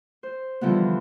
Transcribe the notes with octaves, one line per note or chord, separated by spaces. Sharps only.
C5
D3 E3 F3 G3 B3